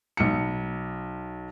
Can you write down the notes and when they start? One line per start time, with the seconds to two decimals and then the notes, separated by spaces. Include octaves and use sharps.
0.17 B1 C#7